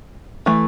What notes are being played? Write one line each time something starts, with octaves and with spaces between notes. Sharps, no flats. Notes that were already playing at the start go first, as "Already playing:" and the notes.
E3 A3